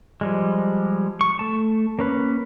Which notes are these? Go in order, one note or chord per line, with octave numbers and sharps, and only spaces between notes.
F3 G3 G#3
C#6
A3 A5
A#3 C#4 B4